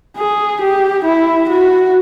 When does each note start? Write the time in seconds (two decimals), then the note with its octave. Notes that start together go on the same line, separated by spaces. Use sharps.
0.17 G#4
0.61 G4
1.05 E4
1.49 F#4